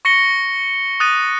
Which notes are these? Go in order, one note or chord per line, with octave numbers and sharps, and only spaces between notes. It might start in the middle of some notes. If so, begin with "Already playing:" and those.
C#6 A#6 C#7 G7
D#6 F#6 A6 D#7